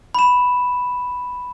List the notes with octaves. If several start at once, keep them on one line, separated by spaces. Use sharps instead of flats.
B5 E7